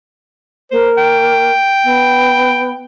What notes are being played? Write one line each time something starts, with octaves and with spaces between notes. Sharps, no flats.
A#3 C5
G5
B3